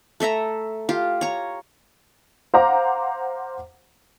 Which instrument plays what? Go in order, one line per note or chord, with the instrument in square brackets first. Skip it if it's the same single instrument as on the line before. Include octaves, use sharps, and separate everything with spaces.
[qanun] A3 A4 E5 A#5
F4 G4
C#5 A#5
[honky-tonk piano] C5 F5 F#5 A#5 D6